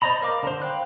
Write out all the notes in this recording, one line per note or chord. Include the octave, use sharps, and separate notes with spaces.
C5 D5 D#5 A#5 B5
A#4 F5 D6
D3 C5
F5 G5 B5 F#6